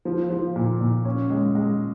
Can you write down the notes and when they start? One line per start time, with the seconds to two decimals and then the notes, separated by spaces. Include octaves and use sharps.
0.05 F3
0.30 F3
0.56 A#2
0.80 A#2
1.05 C#4
1.30 G#3
1.55 G#3